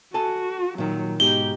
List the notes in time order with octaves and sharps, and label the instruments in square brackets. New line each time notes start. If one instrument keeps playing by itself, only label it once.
[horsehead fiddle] F#4 [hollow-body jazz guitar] A4 G#5 A5
[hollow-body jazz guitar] A#2 D#3 [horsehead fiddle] F#3
[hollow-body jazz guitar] G#2 B2 D#4 [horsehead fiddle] G4 [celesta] G7